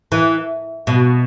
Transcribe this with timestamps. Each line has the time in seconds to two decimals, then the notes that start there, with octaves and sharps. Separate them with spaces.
0.12 E3
0.87 B2